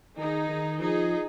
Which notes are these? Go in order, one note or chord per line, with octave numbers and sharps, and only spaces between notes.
D#3 D#4 G#4
D#3
F3 D#4 G#4